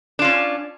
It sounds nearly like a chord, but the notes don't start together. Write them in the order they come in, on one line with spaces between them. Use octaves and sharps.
D4 F4 C#4